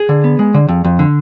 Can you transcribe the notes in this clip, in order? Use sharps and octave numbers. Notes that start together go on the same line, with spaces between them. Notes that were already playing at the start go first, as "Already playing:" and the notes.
Already playing: G#4
D3
B3
G#3
D3
F2
F2
D3